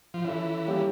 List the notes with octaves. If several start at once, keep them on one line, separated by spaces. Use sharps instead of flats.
F3
E3 C#4 F4 A4
G3 A#3 C#4 E4 G4